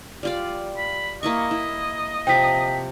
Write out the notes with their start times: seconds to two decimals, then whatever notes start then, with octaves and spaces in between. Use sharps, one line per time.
0.23 G3 F4 D5
0.78 B5
1.23 A#3 E4 D#5 C#6
1.51 E4
2.27 C3 F3 G5 B6